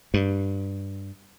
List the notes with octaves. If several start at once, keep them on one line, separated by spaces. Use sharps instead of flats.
G2